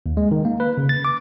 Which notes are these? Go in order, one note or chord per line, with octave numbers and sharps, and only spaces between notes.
D#2
G#3
D#3
A#3
B4
C#3
A6
D6